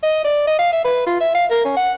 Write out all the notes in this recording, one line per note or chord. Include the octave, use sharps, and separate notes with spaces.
D#5
D5
D#5
F5
E5
B4
F4
E5
F5
A#4
C#4
F#5